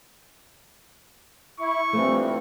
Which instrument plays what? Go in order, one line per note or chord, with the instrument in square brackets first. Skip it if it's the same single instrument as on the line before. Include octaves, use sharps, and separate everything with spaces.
[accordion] E4 [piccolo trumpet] C#6
[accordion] G2 E3 F3 [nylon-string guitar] A3 C4